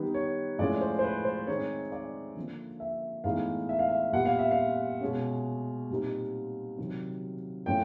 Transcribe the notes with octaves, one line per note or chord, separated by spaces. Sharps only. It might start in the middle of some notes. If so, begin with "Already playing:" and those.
Already playing: D#3 G3 B3 D#4 B4
C#5
A2 F3 G#3 C#4 D5
C5
C5
B4
C5
D#3 G#3 C4 D#4 C#5
D5
D3 F3 A#3
E5
A2 E3 G#3 B3 D#4 F5
E5
F5
E5
A#2 G3 B3 F#5
F5
E5
F5
B2 G#3 C#4
A#2 G3 C4 D#4
C3 D#3 F#3
A2 F3 A3 C#4 G5